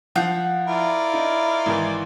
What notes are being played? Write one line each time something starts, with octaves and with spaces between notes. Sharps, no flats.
F3 F5 F#5 G6
E4 F4 A#4 D5
D#4
G#1 D#3 E3